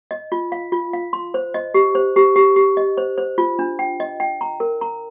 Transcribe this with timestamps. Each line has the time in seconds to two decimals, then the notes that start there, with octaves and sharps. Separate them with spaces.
0.11 D#5
0.32 F4
0.52 F5
0.72 F4
0.93 F5
1.13 C6
1.34 C5
1.54 D#5
1.74 G4
1.95 C5
2.16 G4
2.36 G4
2.56 G4
2.77 D#5
2.97 C5
3.18 C5
3.38 F4
3.59 D4
3.79 G5
4.00 D#5
4.20 G5
4.41 A#5
4.60 A#4
4.81 A#5